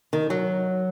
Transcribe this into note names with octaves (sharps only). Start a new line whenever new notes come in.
D#3
F#3